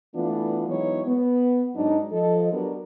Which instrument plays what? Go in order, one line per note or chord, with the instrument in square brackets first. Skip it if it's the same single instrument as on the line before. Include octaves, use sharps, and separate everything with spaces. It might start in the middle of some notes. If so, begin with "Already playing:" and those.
[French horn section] E3 A3 B3 D4 F4
E3 F#3 G#3 B3 D#4 C#5
B3
G#2 F#3 D4 D#4
F3 A4 D#5
F#3 B3 D4 G4 A#4